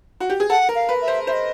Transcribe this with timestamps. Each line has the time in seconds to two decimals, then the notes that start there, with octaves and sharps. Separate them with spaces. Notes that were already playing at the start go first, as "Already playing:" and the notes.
0.20 F#4
0.30 G4
0.40 G#4
0.50 A4 F#5
0.69 A#4
0.75 F5
0.89 B4
1.01 E5
1.08 C5
1.27 C5 E5
1.33 D#5